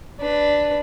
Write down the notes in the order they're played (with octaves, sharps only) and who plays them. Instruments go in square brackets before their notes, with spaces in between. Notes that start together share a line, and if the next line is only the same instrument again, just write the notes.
[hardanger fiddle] D4 B4